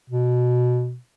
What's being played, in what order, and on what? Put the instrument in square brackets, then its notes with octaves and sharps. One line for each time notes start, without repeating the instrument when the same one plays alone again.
[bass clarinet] B2